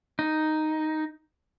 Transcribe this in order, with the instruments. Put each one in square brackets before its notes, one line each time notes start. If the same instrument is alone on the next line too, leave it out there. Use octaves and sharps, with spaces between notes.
[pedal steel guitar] D#4